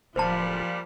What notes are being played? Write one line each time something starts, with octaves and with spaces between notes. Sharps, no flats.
D1 A#2 F3 G3 C5 A5